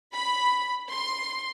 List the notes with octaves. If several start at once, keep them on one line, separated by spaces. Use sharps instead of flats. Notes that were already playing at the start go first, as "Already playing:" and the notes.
B5
C6